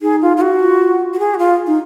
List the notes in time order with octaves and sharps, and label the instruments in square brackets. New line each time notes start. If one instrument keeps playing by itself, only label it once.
[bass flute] D#4 [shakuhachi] G#4
[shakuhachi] F4
F4
F#4
[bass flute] F4
[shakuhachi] F#4
G#4
F#4
F4
[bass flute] D#4